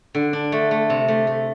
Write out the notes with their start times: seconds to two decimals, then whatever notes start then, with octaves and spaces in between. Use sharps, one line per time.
0.15 D3
0.33 D4
0.52 A3
0.71 A3
0.90 C3
1.08 A3
1.27 A3